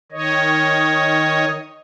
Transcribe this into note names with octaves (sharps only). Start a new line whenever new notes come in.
D#3 C#5 D#5